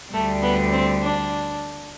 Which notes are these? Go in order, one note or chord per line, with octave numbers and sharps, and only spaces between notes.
D2 D3 G3 A3
B3
C4
D4